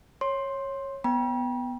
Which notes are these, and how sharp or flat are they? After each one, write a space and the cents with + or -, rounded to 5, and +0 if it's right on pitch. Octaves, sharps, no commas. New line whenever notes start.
C#5 -15 C6 +10
B3 +0 G5 +5 B5 -45